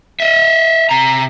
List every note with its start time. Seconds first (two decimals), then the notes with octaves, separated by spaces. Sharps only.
0.20 D#5 E5
0.89 C3 A#5